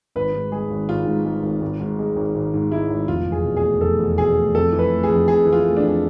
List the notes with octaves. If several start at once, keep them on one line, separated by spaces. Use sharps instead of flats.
G#1 B4
G#2
G#3 G#4
G#1
G#1 F4
G#2
G#3
G#1
G#1
G#2
G#3
G#1
G#1
G#2
G#3 E4
G#1
F1 F4
E2
G#4
B2
G#4
A3
F1 A4
E2
B2 G#4
A3
F2 A4
E3
B4
A3
G#4
F2
F2 G#4
E3
F4
A3
D4
F2